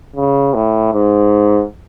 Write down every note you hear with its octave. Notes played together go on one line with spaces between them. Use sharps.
C#3
A2
G#2